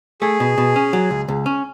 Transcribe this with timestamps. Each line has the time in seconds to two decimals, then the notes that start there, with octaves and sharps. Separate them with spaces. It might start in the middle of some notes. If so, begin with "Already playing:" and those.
0.21 A3 G#4
0.40 B2
0.58 B2
0.76 C#4
0.93 F#3
1.11 C#2
1.28 C#2
1.46 C#4